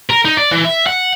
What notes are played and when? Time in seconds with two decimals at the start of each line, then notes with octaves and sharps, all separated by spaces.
0.10 A#4
0.25 D#4
0.37 D5
0.51 E3
0.64 E5
0.86 F#5